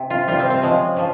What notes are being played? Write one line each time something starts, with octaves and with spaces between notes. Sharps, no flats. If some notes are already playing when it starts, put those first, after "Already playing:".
Already playing: C3
F4
C3 G3 F4
C4
C4
C#3 F3 G#3
C#3 F3